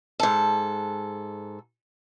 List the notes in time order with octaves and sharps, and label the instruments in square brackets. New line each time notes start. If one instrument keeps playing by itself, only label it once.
[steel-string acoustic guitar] G#2 A4